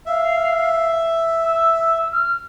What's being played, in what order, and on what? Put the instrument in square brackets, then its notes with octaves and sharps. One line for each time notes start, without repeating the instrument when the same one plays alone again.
[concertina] E5 [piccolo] F5
[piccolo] E6
E6
F6